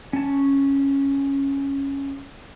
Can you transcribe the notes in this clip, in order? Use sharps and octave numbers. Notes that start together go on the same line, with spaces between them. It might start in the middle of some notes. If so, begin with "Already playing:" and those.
C#4 A5